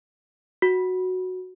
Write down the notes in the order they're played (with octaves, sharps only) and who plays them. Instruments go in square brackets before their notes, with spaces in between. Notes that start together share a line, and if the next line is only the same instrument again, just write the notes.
[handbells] F#4